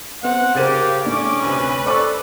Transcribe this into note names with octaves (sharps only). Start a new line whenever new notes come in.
B3 C4 F#5
C#3 G4 A#4 C5 F5 D6 A6 D#7
A2 C#4 D4 D6
D2 C3 B4
A4 C5 D5 C#6 D6 E6 F#6